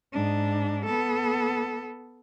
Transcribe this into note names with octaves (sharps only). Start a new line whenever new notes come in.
G#2 D4
B3 A4